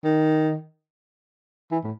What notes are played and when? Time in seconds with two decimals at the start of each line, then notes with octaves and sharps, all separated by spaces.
0.04 D#3
1.71 E3
1.84 A2